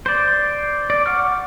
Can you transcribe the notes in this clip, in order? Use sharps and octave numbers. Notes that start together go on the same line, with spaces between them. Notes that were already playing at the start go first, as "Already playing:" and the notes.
C5 D5
D5
F#5 C#6 D6 F6